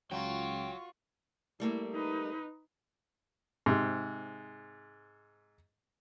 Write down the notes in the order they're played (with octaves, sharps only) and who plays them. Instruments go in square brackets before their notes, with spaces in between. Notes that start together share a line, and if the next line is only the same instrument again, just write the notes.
[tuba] C#2 [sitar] F#3 [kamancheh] F4 C#6 [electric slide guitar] G5
[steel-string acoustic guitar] G3 A3 A#3 [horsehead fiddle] E4
[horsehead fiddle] D#4 B4
[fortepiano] G#2 C3